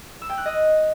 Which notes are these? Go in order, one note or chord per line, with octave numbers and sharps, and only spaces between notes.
E6
G5
F#6
D#5